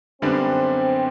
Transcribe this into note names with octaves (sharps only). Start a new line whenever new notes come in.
F#2 D3 G3 B3 C4 D4